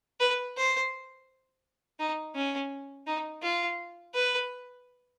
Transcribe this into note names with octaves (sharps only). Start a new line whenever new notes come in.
B4
C5
D#4
C#4
D#4
F4
B4